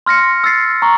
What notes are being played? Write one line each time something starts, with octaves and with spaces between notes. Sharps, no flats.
C6 F6 A#6 C#7
E6 A6 C7
A#5 C#6